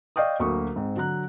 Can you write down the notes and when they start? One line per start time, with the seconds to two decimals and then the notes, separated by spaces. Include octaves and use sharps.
0.16 D5 D#5 F5 G5 C#6 D#6
0.40 D2 F#3 A#3 C#6 D#6
0.76 G#2 C4
0.96 D3 F#3 A#5 F#6